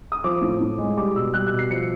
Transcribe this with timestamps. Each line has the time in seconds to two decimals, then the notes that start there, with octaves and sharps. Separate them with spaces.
0.12 D#6
0.24 F3 D6
0.42 A2
0.61 A2
0.78 G#3
0.97 G3 D6
1.16 B2 E6
1.34 G3 F#6
1.47 F#6
1.53 B2
1.59 C7
1.71 F3 C#7